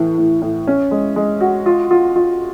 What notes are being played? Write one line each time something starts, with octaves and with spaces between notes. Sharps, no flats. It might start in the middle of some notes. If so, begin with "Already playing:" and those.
Already playing: A2 E3
A2
A2
C#4
G#3
G#3
F#4
F4
F4
F4